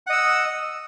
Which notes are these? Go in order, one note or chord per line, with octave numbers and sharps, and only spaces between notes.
D#5 F#5 E6